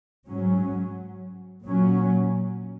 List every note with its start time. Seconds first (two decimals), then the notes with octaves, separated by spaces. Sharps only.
0.27 G#2 F#3 C#4
1.65 A#2 F#3 C#4